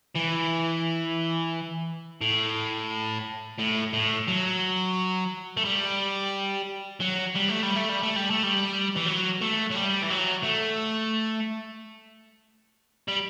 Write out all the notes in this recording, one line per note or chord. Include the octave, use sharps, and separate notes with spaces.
E3
A2
A2
A2
F#3
A3
G3
F#3
G3
A3
G3
A3
G3
A3
G3
A3
G3
E3
F#3
A3
F#3
G3
E3
F#3
A3
G3